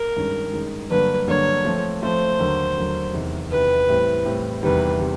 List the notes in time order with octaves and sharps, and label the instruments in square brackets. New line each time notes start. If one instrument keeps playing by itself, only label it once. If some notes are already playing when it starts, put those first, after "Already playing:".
Already playing: [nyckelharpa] A#4
[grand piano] G2 D#3 G#3 C#4
G2 D#3 G#3 C#4
[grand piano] G2 D3 F#3 A#3 D4 [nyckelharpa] B4
[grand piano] G2 D3 F#3 A#3 D4 [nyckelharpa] C#5
[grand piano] F3 A3 C4
[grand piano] F3 A3 C4 [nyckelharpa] C5
[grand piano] D#2 D3 F#3
D#2 D3 F#3
E2 C3 D#3
[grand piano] E2 C3 D#3 [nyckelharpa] B4
[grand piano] A2 E3 G3 C4
A2 E3 G3 C4
[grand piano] E2 C3 D#3 G3 [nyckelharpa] B4
[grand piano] C3